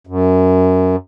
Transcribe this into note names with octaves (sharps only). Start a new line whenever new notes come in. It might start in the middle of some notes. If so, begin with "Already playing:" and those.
F#2